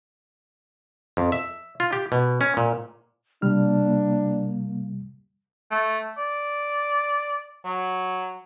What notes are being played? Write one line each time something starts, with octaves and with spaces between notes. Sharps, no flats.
F2
E5
F4
G4
B2
C#4
A#2
C3 G3 A#3 D4 F6
A3
D5
F#3